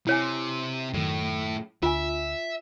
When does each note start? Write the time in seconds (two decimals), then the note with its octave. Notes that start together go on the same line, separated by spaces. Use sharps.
0.07 C3 E4 C#5 G#5
0.94 F#2 A2 D#3
1.83 D2 F4 E5 G#5